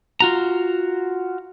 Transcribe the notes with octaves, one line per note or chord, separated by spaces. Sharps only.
F4 F#4 A#5